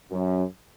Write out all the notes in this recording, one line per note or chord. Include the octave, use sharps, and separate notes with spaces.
F#2